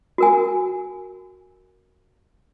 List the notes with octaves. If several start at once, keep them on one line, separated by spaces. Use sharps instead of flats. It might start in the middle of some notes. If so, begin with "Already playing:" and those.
F#4 A#4 G#5